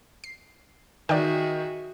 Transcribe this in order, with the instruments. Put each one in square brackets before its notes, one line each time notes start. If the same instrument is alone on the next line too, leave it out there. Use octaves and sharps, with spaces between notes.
[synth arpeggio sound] C7
[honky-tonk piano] D#3 [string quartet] F#4 G#4 E5 [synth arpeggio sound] D5 G5